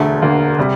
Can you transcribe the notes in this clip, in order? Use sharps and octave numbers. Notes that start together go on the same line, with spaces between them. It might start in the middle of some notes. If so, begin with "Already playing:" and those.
Already playing: E1 D2 D3 A3
E1 D2 D3 A#3
C3 G3